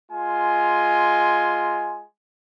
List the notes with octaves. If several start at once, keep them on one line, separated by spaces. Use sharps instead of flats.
G#3 F4 G#5